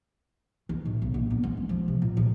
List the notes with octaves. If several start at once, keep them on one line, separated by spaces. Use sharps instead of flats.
D#3
A2
B1
A#1
B3
G#3
C#4
F3
C3
A#2
G#3